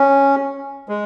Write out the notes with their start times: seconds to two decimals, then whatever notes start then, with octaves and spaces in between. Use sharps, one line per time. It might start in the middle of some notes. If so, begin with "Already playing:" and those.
Already playing: C#4
0.89 G#3